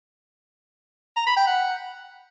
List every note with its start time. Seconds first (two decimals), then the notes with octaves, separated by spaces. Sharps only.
1.17 A#5
1.27 B5
1.37 G5
1.47 F#5